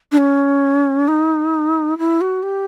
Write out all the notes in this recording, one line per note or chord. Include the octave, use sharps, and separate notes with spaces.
D4
C#4
D#4
E4
F#4
G4